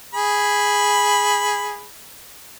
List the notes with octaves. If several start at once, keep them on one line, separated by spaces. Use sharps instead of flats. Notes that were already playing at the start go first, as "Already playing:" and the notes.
G#4 B5